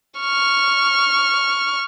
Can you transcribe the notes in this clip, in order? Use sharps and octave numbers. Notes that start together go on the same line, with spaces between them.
C#6 F6